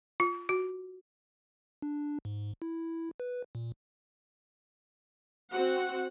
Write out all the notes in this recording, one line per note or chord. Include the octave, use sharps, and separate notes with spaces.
F4
F#4
D4
G#2
E4
B4
A#2
C4 F#4 F#5